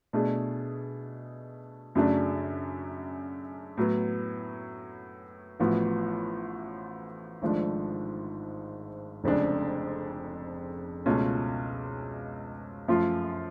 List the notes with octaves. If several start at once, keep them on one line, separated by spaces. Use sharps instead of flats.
B2 A3 D4 G#4
F#2 C#3 F#3 A3 D4
A2 F#3 B3
A1 A2 F3 B3 F#4
G#1 G#2 F3 A3 D4
F1 F2 C#3 G#3 D4
C#2 B2 A3 C#4 F4
F#2 F3 A3 F4